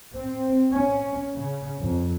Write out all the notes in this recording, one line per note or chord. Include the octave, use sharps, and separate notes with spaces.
C4
C#4
C#3
F2